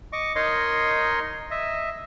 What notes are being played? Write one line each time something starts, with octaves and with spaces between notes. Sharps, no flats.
D#5 C#6 D6
D#4 A#4 C#5 D#5 C6
D#5 E5